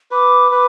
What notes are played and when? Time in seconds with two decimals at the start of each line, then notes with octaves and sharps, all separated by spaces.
0.11 B4 D6
0.52 B4